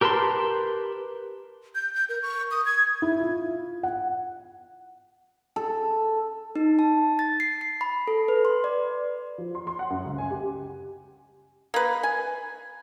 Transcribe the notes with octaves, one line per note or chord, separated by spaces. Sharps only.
G4 A#4 B4 A5 C6
G6
G6
A#4
C#6
D#6
G#6
E4
F4
F#5
A4
D#4
A5
A6
C7
C7
B5
A4
B4
C6
D5
F3
C6
C6
F#5
F#2
C#2
G#5
G4
A#3 B4
G#5